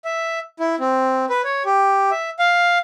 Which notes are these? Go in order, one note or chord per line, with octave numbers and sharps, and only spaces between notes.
E5
E4
C4
B4
C#5
G4
E5
F5